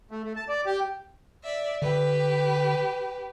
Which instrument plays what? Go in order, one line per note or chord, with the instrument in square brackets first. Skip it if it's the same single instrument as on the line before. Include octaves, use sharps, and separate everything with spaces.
[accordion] A3
A3
A5
D5
G4
[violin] D5 E5
[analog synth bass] D3 [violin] G4 B4